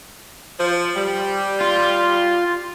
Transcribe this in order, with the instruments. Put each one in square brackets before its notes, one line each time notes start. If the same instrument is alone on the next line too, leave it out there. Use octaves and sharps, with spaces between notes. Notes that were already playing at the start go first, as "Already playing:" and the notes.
[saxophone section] F3
G3
[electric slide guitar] F4